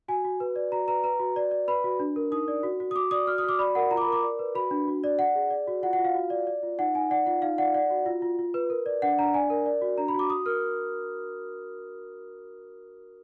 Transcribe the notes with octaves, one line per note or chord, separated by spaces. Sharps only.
F#4 G#5
F#4
B4
D5
F#4 A#5
B4 A#5
B4 A#5
F#4
D5
D5
B4 B5
F#4
D4
A#4
D#4 D#6
D5
F#4
F#4
D#6
F#4 D6
D5 D#6
F#4 F6
D#6
F#4 D6
D5 B5
A#4 F#5
F4 A#5
D6
B5
A#4
D6
D5
B4
F#4 B5
D4
F#4
D5
D5 F#5
G#4
D5
F#4
F4 F#5
F#5
F4
F5
F#4
D5
D5
F4
D#4 F#5
D#4 G#5
D5 F#5
F4 F#5
D#4 F5
D5 F#5
D5 F#5
F#4
F4
F4
F4
B4
A#4
D5
D4 F#5
D4 A#5
D5 G#5
A#4
D5
F#4
D4 A#5
B5
F#4 D6
F#4 D#6
A#4 F6